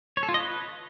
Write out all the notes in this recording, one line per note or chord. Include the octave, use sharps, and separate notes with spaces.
C#5
A4
F4
D#5
B4